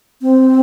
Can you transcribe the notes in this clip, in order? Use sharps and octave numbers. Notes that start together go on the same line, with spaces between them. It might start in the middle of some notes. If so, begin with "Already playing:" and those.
C4